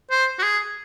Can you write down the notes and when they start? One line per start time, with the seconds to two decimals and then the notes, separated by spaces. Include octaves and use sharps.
0.10 C5
0.39 F#4
0.43 G#4